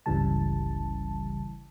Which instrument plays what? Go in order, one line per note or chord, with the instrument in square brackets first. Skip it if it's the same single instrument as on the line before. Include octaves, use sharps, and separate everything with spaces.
[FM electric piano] G1 C#2 C#3 E3 G3 A5